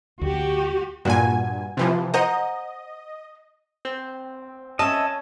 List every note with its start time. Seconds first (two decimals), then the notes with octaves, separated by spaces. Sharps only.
0.21 D2 F#4 G4
1.05 G2 A#2 F#4 G#5
1.77 C3 E3 F3
2.14 C5 D#5 F#5 A#5
3.85 C4
4.79 C#4 C#5 D#5 E5 A5